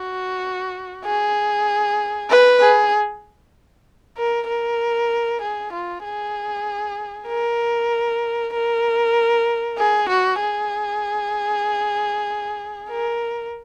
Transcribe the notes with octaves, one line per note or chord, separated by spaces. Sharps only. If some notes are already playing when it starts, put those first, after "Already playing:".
Already playing: F#4
G#4
B4
G#4
A#4
A#4
G#4
F4
G#4
A#4
A#4
G#4
F#4
G#4
A#4